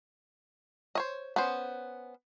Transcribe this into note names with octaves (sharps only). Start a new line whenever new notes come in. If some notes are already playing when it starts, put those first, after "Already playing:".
C5 C#5 D#5
B3 C#4 C5